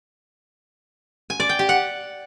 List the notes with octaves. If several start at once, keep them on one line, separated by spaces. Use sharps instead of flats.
G#5
D5
G5
G4
F#5